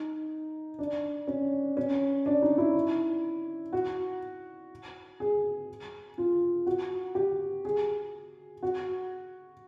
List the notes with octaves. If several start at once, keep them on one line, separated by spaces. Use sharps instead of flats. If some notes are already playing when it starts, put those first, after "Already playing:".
Already playing: D#4
D4
C#4
C#4
D4
D#4
E4
F#4
G#4
F4
F#4
G4
G#4
F#4